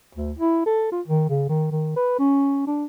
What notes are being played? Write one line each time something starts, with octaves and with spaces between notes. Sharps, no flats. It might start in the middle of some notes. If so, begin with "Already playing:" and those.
D2
E4
A4
F4
D#3
C#3
D#3
D#3
B4
C#4
D4